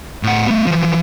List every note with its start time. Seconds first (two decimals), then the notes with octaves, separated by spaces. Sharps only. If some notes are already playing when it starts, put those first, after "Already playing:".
0.23 A2 F#5
0.47 A3 B3
0.67 E3 F3